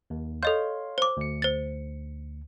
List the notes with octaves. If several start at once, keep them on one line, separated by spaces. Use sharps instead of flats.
D#2
A4 C#5 D#5 F5 C6 G6
C5 D6
D2 C#7
C5 A6